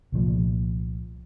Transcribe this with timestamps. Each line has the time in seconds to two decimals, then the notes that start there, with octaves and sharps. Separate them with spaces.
0.12 C2 A#2 F3 A3